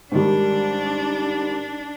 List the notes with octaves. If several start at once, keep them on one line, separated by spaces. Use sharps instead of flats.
G#2 D#3 G3 D4